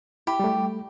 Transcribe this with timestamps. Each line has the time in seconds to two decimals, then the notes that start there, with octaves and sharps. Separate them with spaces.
0.27 E4 G4 B5
0.40 G3 A3